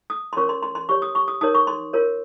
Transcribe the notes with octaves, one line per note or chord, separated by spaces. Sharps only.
D#6
C6
C#4 F4 A#4 C#5 C#6
C6
C6
C6
G4 C#5 C#6
D#6
C#6
D#6
D#4 A#4 C#5 D#6
C#6
C6
F4 A#4 C#5